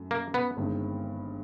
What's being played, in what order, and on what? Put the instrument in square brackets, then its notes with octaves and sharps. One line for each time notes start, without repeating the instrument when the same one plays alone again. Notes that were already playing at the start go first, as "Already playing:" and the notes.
Already playing: [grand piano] F#2 F#3 A3
[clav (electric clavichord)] A#3
B3
[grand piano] G1 G2 D#3 G#3 C4